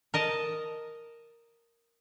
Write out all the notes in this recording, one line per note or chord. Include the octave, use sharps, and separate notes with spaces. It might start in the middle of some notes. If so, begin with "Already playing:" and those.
A#4 D#5 A5